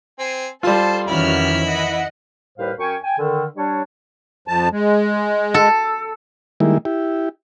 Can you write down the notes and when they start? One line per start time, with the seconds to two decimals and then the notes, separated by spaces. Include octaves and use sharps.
0.19 C4 G#5
0.63 G3 F4 A4 C5 A5 C6
1.08 F2 D#3 E3 C#4 E4 F#4 B5 F6
1.65 D#5 F#5
2.57 D#2 A2 G3 B4 C5 F5
2.79 F#2 C#4 G5 G#5 C#6
3.04 G5 G#5
3.17 D3 D#3
3.55 G3 D4 C#5
4.48 F2 F3 A5
4.72 G#3
5.54 A4
6.60 D#3 G3 G#3 A#3 E4
6.85 E4 G4